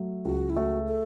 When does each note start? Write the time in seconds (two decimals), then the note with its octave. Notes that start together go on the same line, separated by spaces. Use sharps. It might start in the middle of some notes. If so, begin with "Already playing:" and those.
Already playing: F#3 A3
0.25 C#2 F#4
0.50 E4
0.57 A3 F#4
0.88 A4